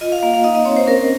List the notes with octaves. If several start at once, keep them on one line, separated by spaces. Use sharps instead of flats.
F4 D#5
F5
A#3 F5
F5
D#4 D#5
D#5
C4 C#5
C5
C#4 A#4